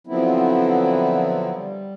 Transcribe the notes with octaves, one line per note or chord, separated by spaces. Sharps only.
D3 F3 F#3 B3 C4 E4
G3